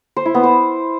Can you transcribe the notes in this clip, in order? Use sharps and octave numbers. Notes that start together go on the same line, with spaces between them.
C5
E4
B3
C5